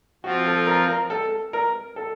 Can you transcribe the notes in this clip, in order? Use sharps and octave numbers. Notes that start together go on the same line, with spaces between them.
F3 C4 F4 F#4
A4
A#4
A#4
A4
A#4
A4